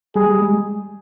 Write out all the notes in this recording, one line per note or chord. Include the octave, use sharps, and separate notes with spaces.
G3 G#4
G3
G#3